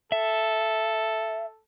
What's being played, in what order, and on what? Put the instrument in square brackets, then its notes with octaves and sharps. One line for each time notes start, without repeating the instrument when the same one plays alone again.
[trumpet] A4 [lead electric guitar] E5